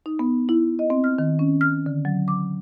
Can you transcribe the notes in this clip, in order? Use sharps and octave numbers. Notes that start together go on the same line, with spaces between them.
D#4
B3
E4
D#5
C4
F6
D#3
C#4
F6
D3
F#3
D6